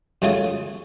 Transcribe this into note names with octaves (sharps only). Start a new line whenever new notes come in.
F#2 G#3 A3 F4 C#5 D#6